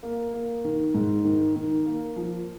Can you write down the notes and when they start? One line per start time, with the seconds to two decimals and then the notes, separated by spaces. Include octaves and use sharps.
0.03 A#3
0.34 A#3
0.65 D#3
0.94 G#2
1.25 D#3
1.56 D#3
1.86 A#3
2.16 F3